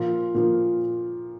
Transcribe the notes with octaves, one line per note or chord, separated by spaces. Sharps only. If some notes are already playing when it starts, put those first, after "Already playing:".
Already playing: A#2 F3 A#3 F4
A#2 F3 A#3 F4